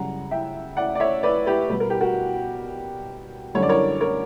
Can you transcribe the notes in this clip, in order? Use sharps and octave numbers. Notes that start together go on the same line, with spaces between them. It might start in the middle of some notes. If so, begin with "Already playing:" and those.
Already playing: F#2 C#3 G3 F#5 A#5
E5 G5
D5 F#5
D5
C#5 E5
B4 D5
G4 B4
B2 G3 B4
A#4
G4
F#4 A#4
F#2 D3 G3 C#5
D5
A#4 C#5
A#4 C#5